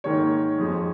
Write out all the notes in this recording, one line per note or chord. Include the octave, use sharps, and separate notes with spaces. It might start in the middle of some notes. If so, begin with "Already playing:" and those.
G#2 D#3 A#3 C#5
F2 F3 G#3